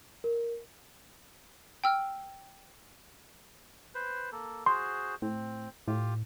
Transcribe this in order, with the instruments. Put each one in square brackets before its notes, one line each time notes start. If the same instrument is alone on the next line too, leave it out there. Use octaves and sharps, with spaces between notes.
[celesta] A#4
[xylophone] G5 E6 F6
[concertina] B4 C5
A#3 A4
[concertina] F#4 G#4 C5 [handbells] C6
[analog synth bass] A2 [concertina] C4
[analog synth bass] A2 [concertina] F4 G4